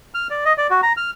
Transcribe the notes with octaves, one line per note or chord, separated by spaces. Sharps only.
F6
D5
D#5
D5
F#4
A#5
F6